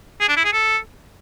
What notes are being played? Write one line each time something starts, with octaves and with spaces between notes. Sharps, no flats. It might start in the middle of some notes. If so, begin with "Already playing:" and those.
G#4
D4
E4
G#4
A4